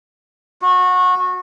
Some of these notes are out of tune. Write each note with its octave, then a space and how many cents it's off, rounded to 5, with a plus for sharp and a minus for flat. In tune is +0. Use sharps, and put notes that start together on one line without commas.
F#4 -25